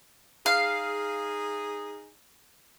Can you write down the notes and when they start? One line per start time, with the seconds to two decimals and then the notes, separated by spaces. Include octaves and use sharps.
0.46 D#4 G#4 F5